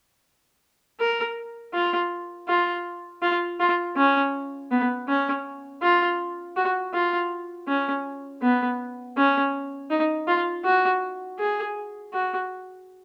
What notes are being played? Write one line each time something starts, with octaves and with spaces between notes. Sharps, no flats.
A#4
F4
F4
F4
F4
C#4
B3
C#4
F4
F#4
F4
C#4
B3
C#4
D#4
F4
F#4
G#4
F#4